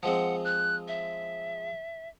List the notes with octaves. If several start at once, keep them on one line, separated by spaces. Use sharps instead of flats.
F3 G#3 C4 F#5
F#6
E5